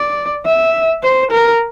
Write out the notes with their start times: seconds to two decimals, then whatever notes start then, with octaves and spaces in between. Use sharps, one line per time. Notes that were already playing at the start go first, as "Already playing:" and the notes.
Already playing: D5
0.45 E5
1.03 C5
1.32 A#4